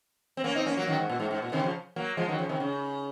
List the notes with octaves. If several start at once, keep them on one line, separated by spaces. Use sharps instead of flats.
C4
A#3 C#4
C4 D#4
A#3 C#4
F#3 A#3
D#3 F#3
G#2
A#2
G#2
G#2
A#2
C3 D#3
C#3 F3
F#3 A#3
F3 G#3
D#3 F#3
C#3 F3
C3 D#3
C#3